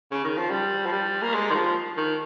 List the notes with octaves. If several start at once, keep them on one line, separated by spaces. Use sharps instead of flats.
C#3
D#3
F3
G3
F3
G3
A#3
G#3
D#3
F3
D#3